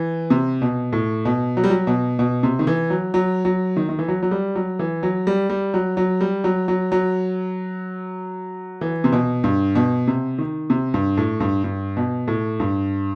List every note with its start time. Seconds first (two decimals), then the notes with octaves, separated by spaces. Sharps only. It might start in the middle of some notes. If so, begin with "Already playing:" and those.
Already playing: E3
0.30 C3
0.62 B2
0.93 A2
1.25 B2
1.57 F#3
1.64 G3
1.70 F#3
1.87 B2
2.19 B2
2.43 C3
2.59 D#3
2.67 E3
2.90 F#3
3.14 F#3
3.45 F#3
3.77 D#3
3.89 D#3
3.99 E3
4.08 F#3
4.23 F#3
4.31 G3
4.55 F#3
4.79 E3
5.03 F#3
5.27 G3
5.49 G3
5.74 F#3
5.97 F#3
6.21 G3
6.44 F#3
6.68 F#3
6.92 F#3
8.81 E3
9.04 C3
9.13 B2
9.44 G2
9.75 B2
10.08 C3
10.38 D#3
10.70 C3
10.94 G2
11.18 A2
11.40 G2
11.64 G2
11.97 B2
12.28 A2
12.60 G2